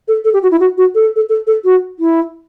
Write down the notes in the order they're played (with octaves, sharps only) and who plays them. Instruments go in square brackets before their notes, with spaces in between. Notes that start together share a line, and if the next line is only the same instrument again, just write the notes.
[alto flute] A4
A4
G4
F#4
E4
F#4
F#4
A4
A4
A4
A4
F#4
E4